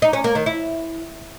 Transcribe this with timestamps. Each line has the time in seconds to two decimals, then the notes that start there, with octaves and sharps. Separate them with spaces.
0.02 D#4
0.13 C#4
0.24 A#3
0.35 D#3
0.46 E4